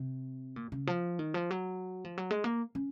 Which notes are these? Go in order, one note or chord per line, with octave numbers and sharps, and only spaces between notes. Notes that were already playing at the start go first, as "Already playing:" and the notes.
Already playing: C3
A#2
C#3
F3
D#3
F3
F#3
F3
F#3
G#3
A#3
C#4